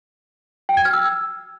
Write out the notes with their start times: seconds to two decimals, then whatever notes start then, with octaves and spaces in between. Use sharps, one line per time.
0.69 G5
0.77 G#6
0.85 F6
0.93 E6